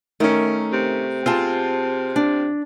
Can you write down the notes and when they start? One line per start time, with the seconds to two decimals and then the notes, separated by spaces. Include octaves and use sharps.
0.20 D#3 A3 C#4 A#4
0.73 C3
1.26 C4 F4 G#4 A5
2.16 D4